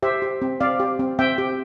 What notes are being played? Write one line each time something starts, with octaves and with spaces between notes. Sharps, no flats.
G4 C5 E5
G4
C4
C4 D5 F5
G4
C4
C4 E5 G5
G4